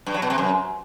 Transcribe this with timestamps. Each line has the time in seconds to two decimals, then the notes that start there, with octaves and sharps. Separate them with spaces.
0.06 G2
0.14 F#3
0.22 B2
0.30 C3
0.38 F#2